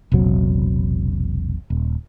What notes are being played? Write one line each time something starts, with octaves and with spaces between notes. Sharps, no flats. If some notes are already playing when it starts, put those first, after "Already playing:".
E1 A#1 C3 F#3
D#1